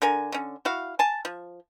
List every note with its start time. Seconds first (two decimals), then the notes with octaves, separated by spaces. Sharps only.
0.02 D3 A#4 G#5
0.32 D3 C#4
0.65 E4 F#4 F5
0.99 G#5 A5
1.25 F3